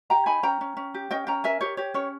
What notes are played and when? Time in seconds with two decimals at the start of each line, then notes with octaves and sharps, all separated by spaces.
0.10 G4 G5 A#5
0.26 D#4 G#5 B5
0.43 C#4 G5 A#5
0.61 C#4
0.77 C#4
0.94 G4
1.11 C#4 D#5 G5
1.27 C#4 G5 A#5
1.44 A#4 E5 G#5
1.61 G4 C#5
1.77 G4 C#5
1.94 C#4 C#5